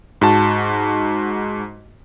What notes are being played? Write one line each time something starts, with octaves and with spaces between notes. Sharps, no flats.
G#2 F#4 A5